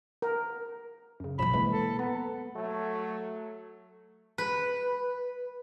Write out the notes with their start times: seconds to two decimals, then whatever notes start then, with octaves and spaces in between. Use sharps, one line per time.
0.22 A#4
1.20 F#2 C#3
1.39 B2 F3 F#3 B5 E7
1.54 E3 G#3 A#3
1.72 A4
1.99 B3 A#5
2.55 F#3 A3
4.38 B4